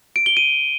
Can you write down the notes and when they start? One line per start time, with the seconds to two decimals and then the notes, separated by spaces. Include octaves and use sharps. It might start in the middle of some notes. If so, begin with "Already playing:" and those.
0.16 D7
0.26 G7
0.37 D#7